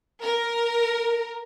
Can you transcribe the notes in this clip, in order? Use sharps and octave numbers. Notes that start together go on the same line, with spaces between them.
A#4